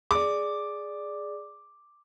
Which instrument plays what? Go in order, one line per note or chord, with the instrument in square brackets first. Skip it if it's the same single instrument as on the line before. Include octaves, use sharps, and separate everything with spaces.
[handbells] G#4 D5 [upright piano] D6